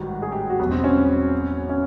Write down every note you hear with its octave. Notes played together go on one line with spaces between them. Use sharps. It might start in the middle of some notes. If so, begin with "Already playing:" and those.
Already playing: A1 G#2 D#3 G3 F#4
G#4
G4
F#4
E1 E2 B2 F#3 B3
C4
C#4
C#4